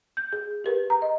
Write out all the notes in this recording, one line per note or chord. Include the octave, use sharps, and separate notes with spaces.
G6
G#4
G4 A#4 B4
A#5
D#5